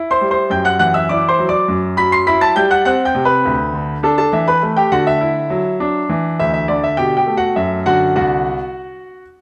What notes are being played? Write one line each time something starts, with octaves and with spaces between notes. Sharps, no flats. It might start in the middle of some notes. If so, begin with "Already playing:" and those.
Already playing: E4
C5 C6
G3
C5 C6
F#2 G5 G6
F#5 F#6
E3 F#5 F#6
E5 E6
E4 D5 D6
C5 C6
F#3
D5 D6
F#2
F#3 B5 B6
C6 C7
E4 B5 B6
A5 A6
G3 G5 G6
F#5 F#6
C4 F#5 F#6
G5 G6
C3
B4 B5
D2
D3
D4 A4 A5
A4 A5
E3 E5
B4 B5
A3
G4 G5
D3 F#4 F#5
E5
E4
F#3
D4
E3
D2 E5
E5
D3 D5
E5
B2 G4 G5
G4 G5
A3
F#4 F#5
F#2 E5
D3 F#4 F#5
C2 F#4 F#5